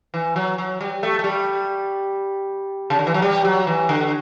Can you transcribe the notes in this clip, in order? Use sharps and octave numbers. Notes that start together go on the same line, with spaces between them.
E3
F#3
F#3
G3
A3
A3
G3
C#3
D3
E3
F#3
G3
F#3
E3
D3